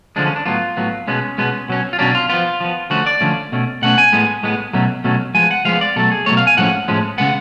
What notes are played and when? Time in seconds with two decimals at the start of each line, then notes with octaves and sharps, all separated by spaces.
0.16 D3 F3 G#3 D4
0.25 C#4
0.36 D4
0.46 A2 F#3 B3 F4
0.77 A2 F#3 B3
1.07 B2 G#3 B3 C#4
1.38 B2 G#3 B3
1.69 B2 F#3 C#4
1.93 F4
1.99 B2 F#3 C#4 D4
2.15 F4
2.29 F3 B3 F4
2.60 F3 B3
2.90 D3 F3 A3 C#4 F#4
3.06 D5
3.21 D3 F3 A3 C#4
3.52 B2 A3 C#4
3.82 B2 A3 C#4 F#5
3.98 G#5
4.13 A2 G#3 B3
4.43 A2 G#3 B3
4.73 B2 F#3 A3 C#4
5.04 B2 F#3 A3 C#4
5.34 F3 G#3 B3 G#5
5.51 F#5
5.65 F3 G#3 B3 F5
5.81 D5
5.96 B2 F#3 A3 A4
6.12 G#4
6.26 B2 F#3 A3 C#5
6.37 F5
6.47 G#5
6.57 A2 F3 G#3 C#4 F#5
6.88 A2 F3 G#3 C#4
7.18 C#3 G#3 B3 F#5